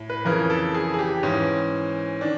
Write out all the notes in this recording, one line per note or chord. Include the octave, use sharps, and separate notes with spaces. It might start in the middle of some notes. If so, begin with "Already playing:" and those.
Already playing: A2
B4
F2 C#3 E3 A#4
A4
G#4
G#4
G4
G#2 E3 C#4
D#3 D4